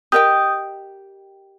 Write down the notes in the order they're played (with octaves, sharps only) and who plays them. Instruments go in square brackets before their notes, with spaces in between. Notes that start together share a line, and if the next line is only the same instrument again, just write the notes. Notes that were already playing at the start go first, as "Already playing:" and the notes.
[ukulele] G4 A#4 D#5 G5 [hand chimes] D#6 G6